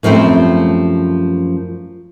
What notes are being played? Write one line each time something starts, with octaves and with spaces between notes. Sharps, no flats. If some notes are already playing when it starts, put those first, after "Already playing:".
F#2 F3 G3 A3 C4